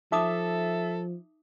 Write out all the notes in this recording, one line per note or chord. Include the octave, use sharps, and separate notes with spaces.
F3 D#4 A4 E5 D6 D#6